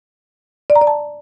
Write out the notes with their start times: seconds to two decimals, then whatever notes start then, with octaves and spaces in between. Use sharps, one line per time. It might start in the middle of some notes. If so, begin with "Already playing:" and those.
0.70 D5
0.76 A#5
0.81 D5
0.87 A5